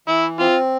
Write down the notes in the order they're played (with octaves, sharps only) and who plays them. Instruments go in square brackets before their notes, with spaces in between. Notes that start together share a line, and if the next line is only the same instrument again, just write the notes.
[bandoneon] E3 [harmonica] E4
[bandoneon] C4 [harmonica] F4